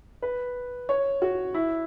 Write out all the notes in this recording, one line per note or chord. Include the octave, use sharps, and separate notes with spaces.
B4
C#5
F#4
E4